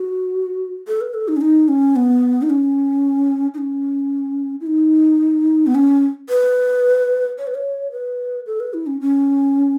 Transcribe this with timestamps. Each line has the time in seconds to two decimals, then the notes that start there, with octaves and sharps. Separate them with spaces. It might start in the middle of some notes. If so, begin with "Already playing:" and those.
Already playing: F#4
0.87 A4
1.01 B4
1.14 A4
1.28 D#4
1.36 C#4
1.41 D#4
1.68 C#4
1.96 B3
2.42 D#4
2.50 C#4
3.54 D#4
3.58 C#4
4.61 E4
4.67 D#4
5.67 B3
5.75 C#4
6.29 B4
7.38 C#5
7.47 B4
7.55 C#5
7.92 B4
8.46 A4
8.60 B4
8.74 E4
8.87 C#4
9.01 C#4